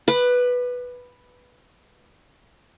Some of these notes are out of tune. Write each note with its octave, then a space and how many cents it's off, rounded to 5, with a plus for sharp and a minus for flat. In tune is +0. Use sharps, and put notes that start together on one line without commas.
B4 +0 D6 +40